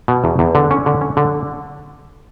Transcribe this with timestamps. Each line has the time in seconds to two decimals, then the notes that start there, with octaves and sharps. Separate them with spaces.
0.08 B2
0.24 E2
0.39 E2
0.55 D3
0.71 C#4
0.86 D3
1.01 C#4
1.17 D3